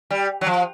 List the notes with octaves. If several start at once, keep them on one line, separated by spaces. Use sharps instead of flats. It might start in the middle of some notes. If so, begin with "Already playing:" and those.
G3
F#3
F3